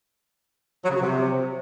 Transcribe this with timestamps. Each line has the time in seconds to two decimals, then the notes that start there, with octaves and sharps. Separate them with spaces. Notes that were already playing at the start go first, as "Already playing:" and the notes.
0.84 F#3
0.90 C#3
0.96 F#3
1.02 C3